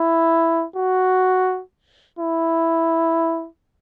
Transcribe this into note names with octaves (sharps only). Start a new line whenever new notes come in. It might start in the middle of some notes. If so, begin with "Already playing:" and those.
Already playing: E4
F#4
E4